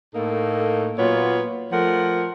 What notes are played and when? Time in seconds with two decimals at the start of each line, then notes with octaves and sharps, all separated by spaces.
0.14 A2 A#3 D#4 A4
0.98 A#2 F#3 B3 F4 C#5
1.72 F3 A3 A#4 F#5